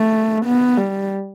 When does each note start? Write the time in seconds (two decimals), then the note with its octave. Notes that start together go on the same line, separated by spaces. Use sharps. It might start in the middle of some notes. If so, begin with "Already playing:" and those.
Already playing: A3
0.45 B3
0.78 G3